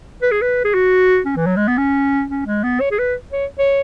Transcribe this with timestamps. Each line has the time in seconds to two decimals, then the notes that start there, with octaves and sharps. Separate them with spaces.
0.22 B4
0.31 G#4
0.41 B4
0.65 G#4
0.74 F#4
1.26 C#4
1.36 E3
1.46 F#3
1.57 G#3
1.68 B3
1.77 C#4
2.29 C#4
2.46 G#3
2.64 B3
2.81 C#5
2.91 G#4
2.99 B4
3.32 C#5
3.59 C#5